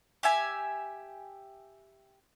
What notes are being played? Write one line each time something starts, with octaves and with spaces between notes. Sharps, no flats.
G4 E5 G#5